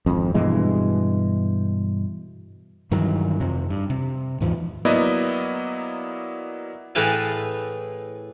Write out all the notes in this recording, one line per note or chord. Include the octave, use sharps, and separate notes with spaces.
G#1 F2
G2 B2 E3 G#3
G2 D#3 E3 F#3
F2 C3
G2
C3
D#2 G#2 E3 F3
F#3 A#3 B3 E4 D5 D#5
A2 E3 G#4 B4 F5 A5